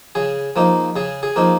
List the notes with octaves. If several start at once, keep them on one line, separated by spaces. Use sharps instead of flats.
C#3 G#4
F3 A#3 D#4
C#3 G#4
G#4
F3 A#3 D#4